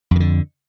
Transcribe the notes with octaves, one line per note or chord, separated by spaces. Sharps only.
F2 D3 D#3